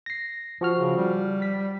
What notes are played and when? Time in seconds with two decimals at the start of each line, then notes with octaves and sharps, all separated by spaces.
0.06 A#6 C7
0.61 F3 F#4 F6
0.78 C#3
0.97 G3
1.42 B6